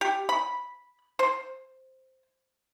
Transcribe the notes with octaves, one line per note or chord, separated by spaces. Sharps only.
G4
B5
C5